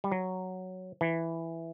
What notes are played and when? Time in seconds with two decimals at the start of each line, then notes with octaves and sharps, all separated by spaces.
0.04 G3
0.12 F#3
1.01 E3